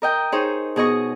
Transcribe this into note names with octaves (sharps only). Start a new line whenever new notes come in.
A#4 D#5 G5
D#4 G#4 C5 C#5
B2 G#4 D#5 C#6